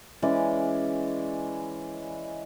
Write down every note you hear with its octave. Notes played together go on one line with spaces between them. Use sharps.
E3 G#3 C#4 D5